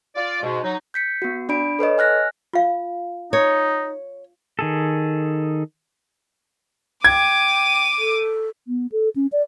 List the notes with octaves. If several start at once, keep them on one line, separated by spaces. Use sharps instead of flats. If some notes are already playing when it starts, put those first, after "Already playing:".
F4 D5
G#2 B2 G#3
F#3 D#4
G6 B6 C#7
B3 F#4
D4 D5 B5 D7
A4 B4 C#5 D#5
G#5 F6 F#6 A#6
F4 F5
D#4 C#5
D#3 G#4 A4
G5 D6 G#6 D#7
A4
B3
A4
C#4
D5